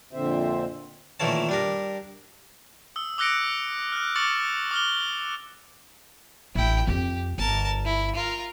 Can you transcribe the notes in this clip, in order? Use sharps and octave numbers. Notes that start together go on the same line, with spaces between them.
F2 A#2 D3 C4 C5 E5
A#2 D#3 E3 A3 C#4 A5
G3 D4 A#4
D#6 E6
D6 E6 F#6 A#6 C#7 D7
F6 F#6
C#6 D6 F6 A6 C#7 F#7
D6 F6 G7
A1 D4 E4 G5
F2 C4 G4
G1 A#4 A5
E4
F4 A#4